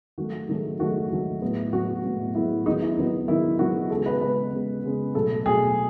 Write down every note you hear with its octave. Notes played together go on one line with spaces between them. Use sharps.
D#3 F#3 A3 F#4
D#3 F#3 A3
D#3 F#3 A3 F#4
D#3 F#3 A3
A2 F#3 B3
A2 F#3 B3 F#4
A2 F#3 B3
A2 F#3 B3 E4
D#3 F#3 B3 D#4
E4
D#3 F#3 B3
D#3 F#3 B3 E4
D#3 F#3 B3 F#4
C#3 G#3 B3 A4
B4
C#3 G#3 B3 B4
C#3 G#3 B3
C#3 G#3 B3
B2 F#3 A3 A4
B2 F#3 A3 G#4